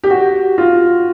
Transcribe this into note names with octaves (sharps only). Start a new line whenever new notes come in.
G4
F#4
F4